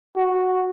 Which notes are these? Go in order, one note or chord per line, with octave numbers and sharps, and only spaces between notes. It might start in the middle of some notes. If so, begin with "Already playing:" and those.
F#4